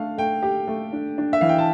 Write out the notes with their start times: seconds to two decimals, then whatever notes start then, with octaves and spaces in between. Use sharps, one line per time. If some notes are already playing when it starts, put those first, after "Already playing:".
Already playing: A3 D4 A4 F5
0.18 A3 G5
0.42 G4
0.68 A3
0.93 D4
1.18 D4
1.33 E5
1.41 E3 F5
1.49 G5
1.58 A5